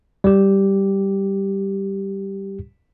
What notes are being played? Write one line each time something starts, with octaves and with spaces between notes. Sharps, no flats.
G3 G4